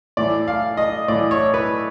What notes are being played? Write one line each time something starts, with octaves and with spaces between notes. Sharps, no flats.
A2 E3 D5
F5
D#5
A2 E3 D5
C#5
B4